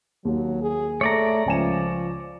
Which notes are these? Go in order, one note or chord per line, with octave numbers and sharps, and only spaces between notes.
D#2 F#3
G#4
A3 C#5 D5 A#5
C#2 F3 G#5 E7